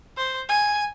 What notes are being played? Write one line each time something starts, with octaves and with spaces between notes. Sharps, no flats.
C5
G#5